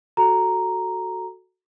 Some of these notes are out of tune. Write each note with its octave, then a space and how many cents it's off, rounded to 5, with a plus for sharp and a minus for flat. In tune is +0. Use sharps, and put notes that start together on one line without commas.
F#4 +0 A4 +0 A#5 +0